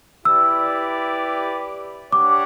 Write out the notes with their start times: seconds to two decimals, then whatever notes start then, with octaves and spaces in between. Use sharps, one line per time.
0.25 E4 G4 B4 D5 E6
2.12 D4 G4 C#5 F#5 D6